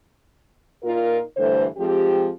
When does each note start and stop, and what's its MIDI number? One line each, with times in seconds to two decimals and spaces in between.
0.84 1.19 46
0.84 1.19 63
0.84 1.19 65
0.84 1.19 70
1.37 1.64 43
1.37 1.64 50
1.37 1.64 52
1.37 1.64 57
1.37 1.64 72
1.77 2.30 53
1.77 2.30 56
1.77 2.30 60
1.77 2.30 67